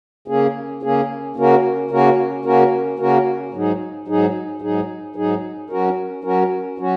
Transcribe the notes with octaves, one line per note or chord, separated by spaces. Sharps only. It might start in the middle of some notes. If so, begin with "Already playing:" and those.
C#3 A#3 C#4 G#4
C#3 A#3 C#4 G#4
C#3 A#3 C#4 F#4 A#4
C#3 A#3 C#4 F#4 A#4
C#3 A#3 C#4 F#4 A#4
C#3 A#3 C#4 F#4 A#4
G#2 F#3 D#4 G#4
G#2 F#3 D#4 G#4
G#2 F#3 D#4 G#4
G#2 F#3 D#4 G#4
F#3 C#4 F#4 A#4
F#3 C#4 F#4 A#4
F#3 C#4 F#4